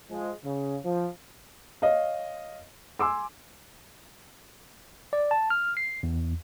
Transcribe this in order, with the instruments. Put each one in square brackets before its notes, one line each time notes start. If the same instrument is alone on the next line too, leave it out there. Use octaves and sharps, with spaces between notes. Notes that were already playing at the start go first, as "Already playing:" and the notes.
[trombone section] F3 G#3
C#3
F3
[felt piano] C#5 D#5 F5
G#5 C6 D6 E6
[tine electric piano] D5
A5
F6
C7
E2